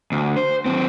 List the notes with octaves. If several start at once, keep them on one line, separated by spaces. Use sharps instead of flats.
D2
C5
D#2 C4